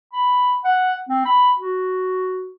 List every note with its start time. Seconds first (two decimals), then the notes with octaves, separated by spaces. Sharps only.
0.13 B5
0.64 F#5
1.09 C4
1.25 B5
1.59 F#4